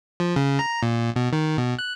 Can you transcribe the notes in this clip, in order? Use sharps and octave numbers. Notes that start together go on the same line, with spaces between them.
F3
C#3
A#5
A#2
B2
D#3
B2
F#6